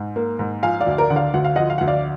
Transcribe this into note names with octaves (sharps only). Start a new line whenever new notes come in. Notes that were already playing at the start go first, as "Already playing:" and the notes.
Already playing: G#2
A#3
G#2
F3 F5 G#5
D5 F5
D2
A#4 D5
D3 F#5
D5 F5
D2 F#5
F5
F3 D#5 F#5
F5
D2 F#5
D5 F5